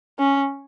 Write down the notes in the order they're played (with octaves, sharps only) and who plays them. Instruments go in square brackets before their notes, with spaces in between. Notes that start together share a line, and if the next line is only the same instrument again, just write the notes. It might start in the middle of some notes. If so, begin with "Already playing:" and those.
[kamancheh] C#4